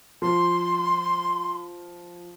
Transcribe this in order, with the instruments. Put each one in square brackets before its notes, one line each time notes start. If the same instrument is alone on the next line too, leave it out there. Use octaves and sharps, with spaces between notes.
[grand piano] F3 [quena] C6